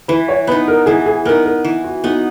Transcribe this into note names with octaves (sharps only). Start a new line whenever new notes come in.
E3 B4
C#5
B3 D#4 B4
A#4
E3 G#4
G#4
B3 D#4 A#4
A#4
E3
F#4
B3 D#4 F#4